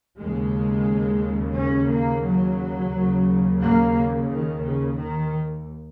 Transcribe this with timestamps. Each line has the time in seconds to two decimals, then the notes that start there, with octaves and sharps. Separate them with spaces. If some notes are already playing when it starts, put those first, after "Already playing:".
0.19 D#2 C#3 G#3
1.56 C#4
1.89 A#3
2.23 F#3
2.92 D#2 C#3
3.60 A#3
4.29 D#3
4.62 C#3
4.96 D#3